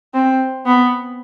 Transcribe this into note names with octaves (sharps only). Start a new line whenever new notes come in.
C4
B3